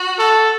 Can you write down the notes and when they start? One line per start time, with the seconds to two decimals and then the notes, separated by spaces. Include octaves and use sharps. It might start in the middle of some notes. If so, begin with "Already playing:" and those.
Already playing: F#4
0.19 A4